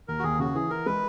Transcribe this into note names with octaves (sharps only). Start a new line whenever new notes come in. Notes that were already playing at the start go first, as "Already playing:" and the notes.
D#2 A#4
F#4
D#2 G#4
C#3 F#4
E3 G#4
E3 A#4
G#3 B4